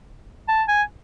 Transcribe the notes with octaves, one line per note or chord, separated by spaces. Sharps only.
A5
G#5